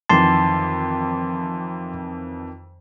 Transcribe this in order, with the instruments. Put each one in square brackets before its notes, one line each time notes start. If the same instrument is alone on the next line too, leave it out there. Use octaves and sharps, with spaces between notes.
[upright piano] F2 D#3 E3 [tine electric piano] A5 C6